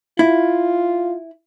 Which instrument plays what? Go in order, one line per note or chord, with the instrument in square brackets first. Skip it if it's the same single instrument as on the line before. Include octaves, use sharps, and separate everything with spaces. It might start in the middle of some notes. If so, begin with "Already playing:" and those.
[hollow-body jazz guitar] E4 [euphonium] F4